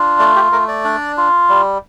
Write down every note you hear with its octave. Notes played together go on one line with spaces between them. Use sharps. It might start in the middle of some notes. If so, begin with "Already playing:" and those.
Already playing: D4 F4
A3 D5
G4
A3 A#4
D5
D4
F4
G3